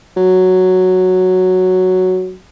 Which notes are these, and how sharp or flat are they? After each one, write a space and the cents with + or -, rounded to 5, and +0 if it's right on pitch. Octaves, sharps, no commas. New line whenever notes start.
F#3 +0